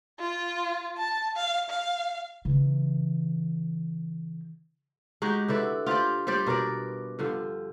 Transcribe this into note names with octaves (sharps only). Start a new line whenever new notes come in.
F4
A5
F5
F5
C#3 E3
G#3 D#4 F#4 G4
D3 E4 B4 D5
F4 G4 C5 D5
G3 G4 C5 D5
B2 A#4 B4 D5
G2 D3 F3